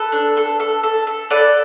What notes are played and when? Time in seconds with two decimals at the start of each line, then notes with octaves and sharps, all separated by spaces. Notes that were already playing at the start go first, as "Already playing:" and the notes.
Already playing: A4 B4
0.12 D4
0.37 A4
0.60 A4
0.83 A4
1.07 A4
1.31 A4 B4 D5